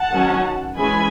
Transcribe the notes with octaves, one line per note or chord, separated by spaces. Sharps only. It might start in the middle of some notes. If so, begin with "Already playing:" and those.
Already playing: F#5 A5
D#3 F#3 C#4
E3 G#3 C#4 G#5 B5